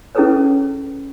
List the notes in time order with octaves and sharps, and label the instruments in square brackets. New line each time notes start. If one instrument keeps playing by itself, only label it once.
[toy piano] C#4 E4 G#4 A4 B4 C#5